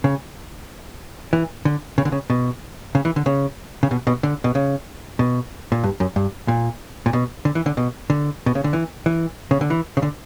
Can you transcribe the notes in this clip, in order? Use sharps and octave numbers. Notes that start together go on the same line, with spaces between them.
C#3
E3
D3
C#3
D3
C#3
B2
C#3
E3
D3
C#3
C#3
B2
B2
D3
B2
C#3
B2
A#2
G2
F#2
G2
A#2
A#2
B2
D3
E3
D3
B2
D3
B2
C#3
D3
E3
E3
C#3
D3
E3
C#3
D3